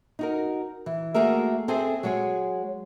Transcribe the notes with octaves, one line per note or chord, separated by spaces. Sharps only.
D#4 F#4 A#4
E3
A3 A#3 F#4 G#4 A#4 E5
C4 G#4 A4 C5 E5 G#5
F#3 G#3 G#4 C#5 G#5